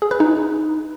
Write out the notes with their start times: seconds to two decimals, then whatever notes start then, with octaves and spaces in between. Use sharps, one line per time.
0.02 G#4
0.11 B4
0.20 D#4